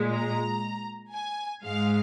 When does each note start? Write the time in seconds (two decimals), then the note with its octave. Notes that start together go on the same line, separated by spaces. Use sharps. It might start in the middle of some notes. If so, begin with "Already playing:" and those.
Already playing: A#2 G#3
0.12 A#5
1.13 G#5
1.63 G#2 G#3 F5